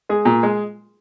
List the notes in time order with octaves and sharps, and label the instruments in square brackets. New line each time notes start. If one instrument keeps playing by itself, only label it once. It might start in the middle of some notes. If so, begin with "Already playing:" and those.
[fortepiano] G#3 G#4
A#2
G#3